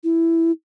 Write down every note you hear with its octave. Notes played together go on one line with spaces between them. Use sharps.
E4